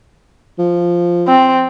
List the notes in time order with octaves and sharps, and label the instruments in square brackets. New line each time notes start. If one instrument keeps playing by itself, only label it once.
[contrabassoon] F3
[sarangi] C4